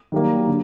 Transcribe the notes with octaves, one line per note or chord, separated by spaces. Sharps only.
D#3 F#3 G3 A#3
D3